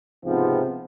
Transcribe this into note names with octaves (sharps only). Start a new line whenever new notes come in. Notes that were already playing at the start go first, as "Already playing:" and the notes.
C#2 G#2 C3 F3 B3 C4